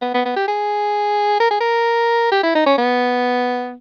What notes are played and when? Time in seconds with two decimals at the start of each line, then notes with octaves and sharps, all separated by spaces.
0.02 B3
0.14 B3
0.25 B3
0.36 G4
0.48 G#4
1.40 A#4
1.50 G#4
1.60 A#4
2.32 G4
2.43 E4
2.55 D#4
2.66 C#4
2.78 B3